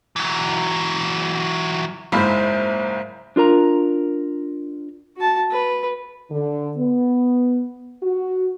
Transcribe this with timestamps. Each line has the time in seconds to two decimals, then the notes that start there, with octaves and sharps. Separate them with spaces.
0.16 E3 F#3
2.12 F#1 G#2 E4 C5 F5
3.36 D4 F4 A#4 A#5
5.17 F#4 A5
5.51 B4
6.31 D3
6.78 B3
8.03 F#4